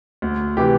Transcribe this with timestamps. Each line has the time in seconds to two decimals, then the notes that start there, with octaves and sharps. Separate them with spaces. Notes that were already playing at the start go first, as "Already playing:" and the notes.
0.22 D2
0.57 C3 E3 G4